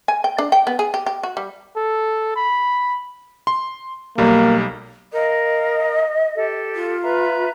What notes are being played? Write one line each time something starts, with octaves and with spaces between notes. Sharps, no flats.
G#5
G5
D4
G5
B3
G#4
G4
G4
F#4
G3
A4
B5
C6
B1 G3 A#3
A#4 D#5 F5
G4 A4
F4
B4 E5 A#5